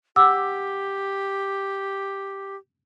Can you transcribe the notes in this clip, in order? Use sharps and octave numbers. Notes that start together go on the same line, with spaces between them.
G4 F#5 D6 E6